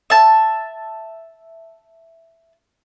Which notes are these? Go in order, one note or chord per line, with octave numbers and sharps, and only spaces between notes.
E5 A5